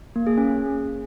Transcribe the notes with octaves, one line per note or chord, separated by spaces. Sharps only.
A#3
G#4
C#4